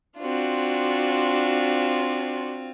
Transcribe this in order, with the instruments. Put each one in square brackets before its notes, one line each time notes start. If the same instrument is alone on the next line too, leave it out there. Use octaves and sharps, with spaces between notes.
[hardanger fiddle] C4 F4 [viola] D4 F#4